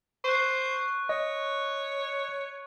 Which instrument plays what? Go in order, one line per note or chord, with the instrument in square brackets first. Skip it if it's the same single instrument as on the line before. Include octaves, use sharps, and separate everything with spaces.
[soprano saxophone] C5 [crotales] C#6 F#6
[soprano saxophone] C#5 [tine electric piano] D#5